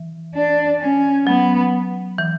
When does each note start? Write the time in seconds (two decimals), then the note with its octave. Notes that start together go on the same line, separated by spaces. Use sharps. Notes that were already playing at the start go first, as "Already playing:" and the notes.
Already playing: E3
0.35 D4
0.80 C#4
1.27 F#3 B3
2.18 E3